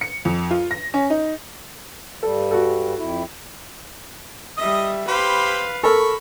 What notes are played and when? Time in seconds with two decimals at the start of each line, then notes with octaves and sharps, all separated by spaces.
0.01 C#7
0.25 F2
0.51 F4
0.71 A#6
0.94 C#4
1.10 D#4
2.23 G2 G3 A4
2.51 F#4 A4
2.98 F2 E4
4.58 G3 D#5 E5 D#6
5.08 G4 B4 C5 F5 B5
5.83 A4 A#4 B5 C#6